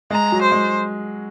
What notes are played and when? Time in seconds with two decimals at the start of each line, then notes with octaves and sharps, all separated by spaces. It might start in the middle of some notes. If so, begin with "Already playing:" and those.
0.11 G#3 A#5
0.32 F#3
0.42 C5
0.52 G#3